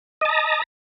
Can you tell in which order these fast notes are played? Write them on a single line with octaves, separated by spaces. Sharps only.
D#5 A5 A#5